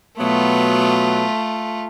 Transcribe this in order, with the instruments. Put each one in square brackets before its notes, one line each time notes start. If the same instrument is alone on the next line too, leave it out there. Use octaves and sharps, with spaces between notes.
[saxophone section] B2 F#3 B3 [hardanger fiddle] A3 F4